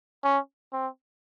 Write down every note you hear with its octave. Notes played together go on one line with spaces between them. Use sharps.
C#4
C4